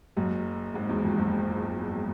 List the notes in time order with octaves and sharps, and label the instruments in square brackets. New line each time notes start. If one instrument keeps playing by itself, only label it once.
[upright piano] F#1 F#2
G#1 G#2
E2
F2
F#1 F#2